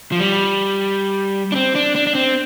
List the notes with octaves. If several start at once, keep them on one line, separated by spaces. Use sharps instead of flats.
F3
G3
D4
C4
D4
D4
D4
C4